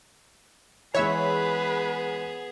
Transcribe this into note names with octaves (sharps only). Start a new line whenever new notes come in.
E3 G#3 B3 G#4 B4 C#5 E5